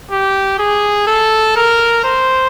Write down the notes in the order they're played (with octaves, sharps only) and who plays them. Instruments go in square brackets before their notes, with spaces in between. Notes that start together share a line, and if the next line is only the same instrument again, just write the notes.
[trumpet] G4
G#4
A4
A#4
C5